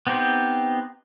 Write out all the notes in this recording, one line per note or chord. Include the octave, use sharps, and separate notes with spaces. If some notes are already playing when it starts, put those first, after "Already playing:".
B3 C4 D#4 G4 C5